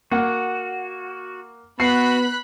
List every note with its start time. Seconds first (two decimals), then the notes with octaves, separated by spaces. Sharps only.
0.12 A#3 F#4 F#5
1.80 B3 F#4 B5 F#6 C7 C#7